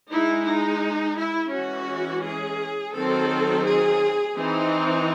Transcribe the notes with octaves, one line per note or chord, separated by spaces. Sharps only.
G#3 D#4 E4
D#4
E4
E3 G#3 C#4 F#4
G#4
D#3 F#3 C4 D#4 A4
G#4
E3 C4 D#4